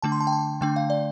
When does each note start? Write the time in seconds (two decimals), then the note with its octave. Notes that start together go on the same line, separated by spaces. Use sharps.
0.02 D3 A3 D4 A5
0.12 C6
0.20 A5
0.27 G5
0.32 A5
0.61 D3 A3 D4 G5
0.76 F5
0.90 D5